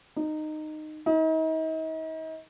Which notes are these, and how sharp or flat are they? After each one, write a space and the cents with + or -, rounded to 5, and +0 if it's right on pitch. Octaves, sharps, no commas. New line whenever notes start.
D#4 -15
D#4 +40